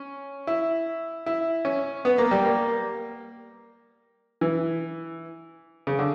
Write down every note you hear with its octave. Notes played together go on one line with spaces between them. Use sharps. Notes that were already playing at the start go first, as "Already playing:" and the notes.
Already playing: C#4
E4
E4
C#4
B3
A#3
G3
A#3
E3
C#3
D3